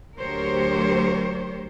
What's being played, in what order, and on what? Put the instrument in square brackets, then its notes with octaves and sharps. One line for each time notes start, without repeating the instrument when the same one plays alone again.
[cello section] D2 F#3 G4 A#4 C5 C#5